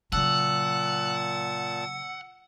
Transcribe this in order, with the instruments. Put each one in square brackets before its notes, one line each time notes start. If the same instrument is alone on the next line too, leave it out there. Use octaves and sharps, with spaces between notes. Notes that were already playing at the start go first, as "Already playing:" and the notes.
[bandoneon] A#2 A5 [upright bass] C#3 F#3 [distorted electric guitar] F#5 [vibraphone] E6